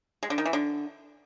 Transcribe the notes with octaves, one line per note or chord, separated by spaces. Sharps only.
G#3
D3
D#3
E3
D3